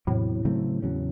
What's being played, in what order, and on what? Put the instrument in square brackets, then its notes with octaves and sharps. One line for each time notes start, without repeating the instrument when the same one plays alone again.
[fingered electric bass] E2 C3 F#3 [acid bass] A2
[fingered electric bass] C#3 F#3 A3 C4
E2 C#3 F#3 C#4